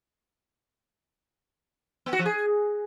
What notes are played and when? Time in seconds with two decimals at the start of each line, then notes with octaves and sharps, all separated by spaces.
2.06 B3
2.13 F#4
2.19 F3
2.26 G#4